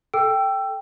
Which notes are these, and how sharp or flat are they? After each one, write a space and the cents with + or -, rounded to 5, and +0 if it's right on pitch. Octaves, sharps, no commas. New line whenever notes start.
A4 -5 G5 +0 E6 +20